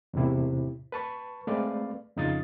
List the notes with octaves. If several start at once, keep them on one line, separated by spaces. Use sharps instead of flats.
E2 A2 C3 E4
B4 A5 C#6
G#3 A3 C4 B4 D5 F5
F2 C#3 D#4 F4 D#6 A6